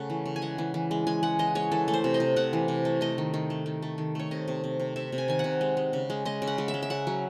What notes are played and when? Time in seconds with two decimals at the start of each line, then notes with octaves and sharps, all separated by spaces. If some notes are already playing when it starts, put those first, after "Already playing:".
Already playing: C#3 A3 F#5
0.10 E3
0.26 C#3
0.36 G#5
0.42 G#3 F#5
0.58 E3
0.74 E3
0.91 G#3
1.07 G#3 G#5
1.23 G#3 F#5
1.39 E3 D#5
1.55 G#3 C#5
1.71 E3 A4
1.88 A3
1.93 C5
2.04 C3
2.14 D#5
2.20 C3
2.36 C3 F#5
2.53 E3
2.68 C3
2.85 A3
3.01 A3 D#5
3.18 D#3
3.34 D#3
3.50 A3
3.66 D#3
3.82 A3
3.98 D#3
4.15 A3 C#5
4.31 C3 D#5
4.48 C3
4.64 C3
4.79 C3
4.96 C3 E5
5.12 C3
5.18 G#5
5.28 D#3 G#5
5.39 C3 F#5
5.61 G#3
5.77 G#3
5.93 C#3
6.10 G#3
6.25 G#3 D#5
6.42 C#3
6.47 F#5
6.58 G#3
6.68 E5
6.74 G#3
6.83 E5
6.90 C#3 F#5
7.07 F#3